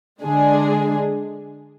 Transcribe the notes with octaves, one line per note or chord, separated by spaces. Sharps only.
D3 G#3 D4 G#4